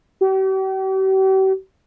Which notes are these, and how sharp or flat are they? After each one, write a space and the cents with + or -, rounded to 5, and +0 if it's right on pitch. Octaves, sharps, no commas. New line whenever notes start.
G4 -45